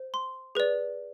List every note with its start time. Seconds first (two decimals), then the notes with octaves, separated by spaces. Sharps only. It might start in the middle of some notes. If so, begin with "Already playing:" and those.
Already playing: C5
0.14 C6
0.55 G#4 B4 D5